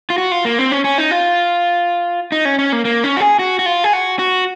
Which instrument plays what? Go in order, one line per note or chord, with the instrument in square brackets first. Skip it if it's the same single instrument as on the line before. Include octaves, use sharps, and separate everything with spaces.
[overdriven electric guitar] F4
F#4
F4
A#3
C4
C#4
C#4
D#4
F4
D#4
C#4
C#4
A#3
A#3
C#4
F#4
G#4
F#4
F#4
F4
G#4
F#4
F#4